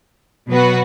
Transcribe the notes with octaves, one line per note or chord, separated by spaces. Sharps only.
B2 F#3 B3 F#4 B4